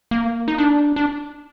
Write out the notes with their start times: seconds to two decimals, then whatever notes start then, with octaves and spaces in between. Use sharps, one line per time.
0.11 A#3
0.48 D#4
0.58 D4
0.96 D4